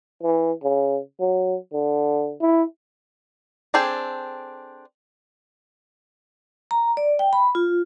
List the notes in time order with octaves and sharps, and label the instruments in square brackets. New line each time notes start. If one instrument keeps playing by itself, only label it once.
[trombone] E3
C#3
F#3
D3
E4
[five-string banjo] C4 D4 G#4 A4 G5
[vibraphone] A#5
D5
G5
B5
F4